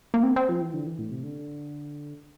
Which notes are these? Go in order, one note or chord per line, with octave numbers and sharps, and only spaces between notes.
A#3
C4
C4
F3
E3
D3
E3
A2
C3
D3